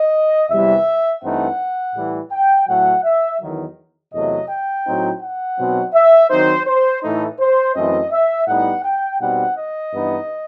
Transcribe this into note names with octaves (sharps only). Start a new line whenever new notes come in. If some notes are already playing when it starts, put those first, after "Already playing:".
Already playing: D#5
E2 C3 E3 G3 E5
G2 E3 A3 C4 D#4 F#5
A2 E3 G3
G5
A2 F#3 A3 F#5
E5
E2 D#3 F#3
E2 C3 F#3 A3 D#5
G5
A2 F#3 C4 D#4
F#5
B2 F#3 C4 D#4
E5
D#3 F#3 C4 D#4 C5
C5
A2 E3 A3 D#4
C5
F#2 E3 A3 C4 D#5
E5
A2 G3 B3 D#4 F#5
G5
B2 G3 C4 D#4 F#5
D#5
G2 E3 B3 D#4